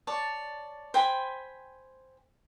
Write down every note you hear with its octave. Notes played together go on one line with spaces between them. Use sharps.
C#5 D5 A5
C5 G5 G#5 B5